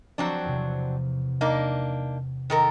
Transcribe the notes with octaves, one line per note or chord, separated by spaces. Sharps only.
F3 F#3 C4 D4 C#6 D6
E2 C3
A#3 D4 D#4
D#3 A4 A#4